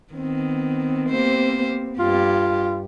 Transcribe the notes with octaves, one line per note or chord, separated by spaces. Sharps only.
D#3 B3 C4
A#3 G4 C5
G2 F4 G4